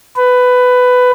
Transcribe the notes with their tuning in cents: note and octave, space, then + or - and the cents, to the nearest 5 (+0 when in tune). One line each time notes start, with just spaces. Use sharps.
B4 +15